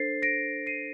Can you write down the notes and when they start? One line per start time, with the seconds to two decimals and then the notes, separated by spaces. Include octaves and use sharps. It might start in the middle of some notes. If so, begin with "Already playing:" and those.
Already playing: D4 A4 C5 A6 C7
0.22 A#6 D7
0.66 C7 D#7